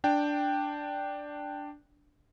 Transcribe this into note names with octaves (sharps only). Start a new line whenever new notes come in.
D4 G5